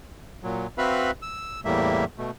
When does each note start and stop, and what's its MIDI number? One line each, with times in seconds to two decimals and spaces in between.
0.44 0.67 46
0.44 0.67 54
0.78 1.11 60
0.78 1.11 66
0.78 1.11 71
0.78 1.11 76
0.78 1.11 77
0.78 1.11 83
1.22 1.60 88
1.65 2.05 40
1.65 2.05 45
1.65 2.05 55
1.65 2.05 58
1.65 2.05 76
2.18 2.31 47
2.18 2.31 57